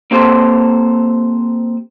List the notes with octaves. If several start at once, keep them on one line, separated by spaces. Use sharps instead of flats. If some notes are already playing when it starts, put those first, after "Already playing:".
A#3 C4 G4 A4 C5